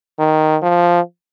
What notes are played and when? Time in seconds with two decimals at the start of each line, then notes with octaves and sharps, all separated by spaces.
0.19 D#3
0.62 F3